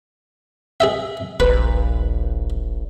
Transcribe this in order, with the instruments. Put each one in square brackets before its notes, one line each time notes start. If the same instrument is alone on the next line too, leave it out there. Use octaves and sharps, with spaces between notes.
[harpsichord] G#4 D#5 E5
[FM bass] D#1 [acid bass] A#1 [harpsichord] B4